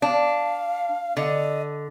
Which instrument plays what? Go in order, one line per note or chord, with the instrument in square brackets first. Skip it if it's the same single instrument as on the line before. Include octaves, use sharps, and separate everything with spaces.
[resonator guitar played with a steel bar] D4 [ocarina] F5
[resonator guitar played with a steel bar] D3 [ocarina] D#5